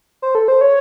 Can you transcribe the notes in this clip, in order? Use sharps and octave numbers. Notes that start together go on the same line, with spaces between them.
C5
A4
C5
C#5